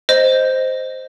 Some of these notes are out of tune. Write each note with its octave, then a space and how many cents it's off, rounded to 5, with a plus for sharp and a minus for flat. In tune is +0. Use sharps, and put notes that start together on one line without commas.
C5 -5 D#5 +0